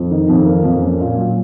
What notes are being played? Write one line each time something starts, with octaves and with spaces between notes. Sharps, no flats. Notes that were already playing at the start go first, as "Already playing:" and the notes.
Already playing: F2
D#3
F2
A#3
F2
C#4
A#2
F#3